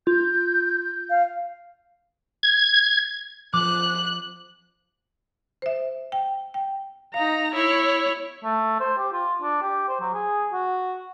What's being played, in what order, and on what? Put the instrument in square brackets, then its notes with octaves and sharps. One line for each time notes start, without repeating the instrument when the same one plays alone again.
[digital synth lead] F4 [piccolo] G6
[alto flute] F5
[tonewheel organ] G#6
[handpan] F3 [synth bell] D6 [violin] F#6
[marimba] C5 E5
G5
G5
[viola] D#4 A#5 [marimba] F5
[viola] E4 C#5
[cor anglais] A3
C5
G4
F4
D4
G4
C5
F#3
G#4
F#4